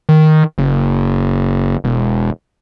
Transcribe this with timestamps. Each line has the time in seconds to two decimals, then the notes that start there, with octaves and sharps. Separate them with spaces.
0.09 D#3
0.58 F#1
1.84 E1